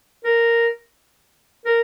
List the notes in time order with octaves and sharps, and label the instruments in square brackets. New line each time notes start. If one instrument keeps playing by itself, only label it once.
[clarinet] A#4
A#4